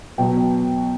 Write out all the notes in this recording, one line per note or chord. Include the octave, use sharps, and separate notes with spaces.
B2 F#3 B3 G5